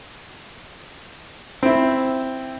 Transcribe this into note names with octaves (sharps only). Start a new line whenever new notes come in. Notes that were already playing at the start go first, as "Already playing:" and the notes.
C4 E4